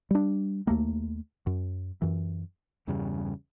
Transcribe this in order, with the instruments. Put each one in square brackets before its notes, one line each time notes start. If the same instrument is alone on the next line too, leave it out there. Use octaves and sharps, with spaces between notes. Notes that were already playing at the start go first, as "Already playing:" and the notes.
[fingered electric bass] G3 D4
D#2 A3 A#3
F#2
F#2 E3
E2 G2 C#3 G3